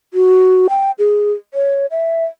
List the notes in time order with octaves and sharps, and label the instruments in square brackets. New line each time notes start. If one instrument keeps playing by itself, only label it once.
[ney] F#4
G5
G#4
C#5
E5